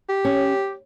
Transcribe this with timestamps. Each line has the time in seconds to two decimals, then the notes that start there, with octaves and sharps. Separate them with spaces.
0.09 G4
0.25 C#4